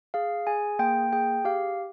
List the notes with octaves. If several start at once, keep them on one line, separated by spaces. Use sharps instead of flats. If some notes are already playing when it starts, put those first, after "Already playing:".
G#4 F5
G#4 G#5
A#3 G5
G#4 G5
G4 F5